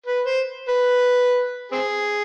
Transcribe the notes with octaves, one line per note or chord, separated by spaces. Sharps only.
B4
C5
B4
C4 G#4